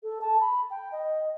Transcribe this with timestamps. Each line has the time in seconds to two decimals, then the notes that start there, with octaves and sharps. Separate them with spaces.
0.03 A4
0.21 A5
0.41 B5
0.70 G5
0.92 D#5